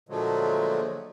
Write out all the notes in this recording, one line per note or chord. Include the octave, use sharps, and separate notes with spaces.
A#2 D3 F3 F#3 G#3 A3